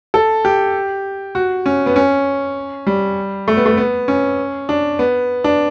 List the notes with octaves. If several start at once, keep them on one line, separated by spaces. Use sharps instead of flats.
A4
G4
F#4
C#4
B3
C#4
G3
A3
B3
A3
B3
C#4
D4
B3
D4